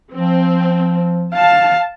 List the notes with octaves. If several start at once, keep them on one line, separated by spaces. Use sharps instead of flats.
F3 C4
F5 A5